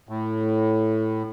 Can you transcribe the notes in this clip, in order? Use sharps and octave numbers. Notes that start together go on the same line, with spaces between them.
A2